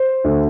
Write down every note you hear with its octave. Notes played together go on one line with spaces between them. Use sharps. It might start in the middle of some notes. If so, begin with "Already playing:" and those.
Already playing: C5
D2 D3 A3